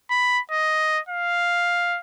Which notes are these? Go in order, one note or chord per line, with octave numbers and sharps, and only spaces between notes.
B5
D#5
F5